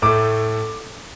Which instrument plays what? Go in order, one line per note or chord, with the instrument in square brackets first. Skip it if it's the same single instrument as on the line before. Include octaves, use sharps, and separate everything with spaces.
[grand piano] A2 A3 D6